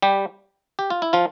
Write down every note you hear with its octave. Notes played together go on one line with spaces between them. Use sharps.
G3 G4
G4
F4
E4
F3 F4